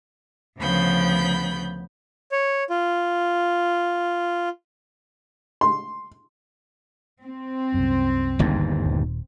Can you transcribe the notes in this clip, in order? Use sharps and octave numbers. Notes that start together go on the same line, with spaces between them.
D2 C#3 F3 B3 B5 G6
C#5
F4
C6
C4
C2 F#2
G1 D#2 G#2
D#1